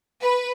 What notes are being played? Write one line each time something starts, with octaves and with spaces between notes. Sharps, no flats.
B4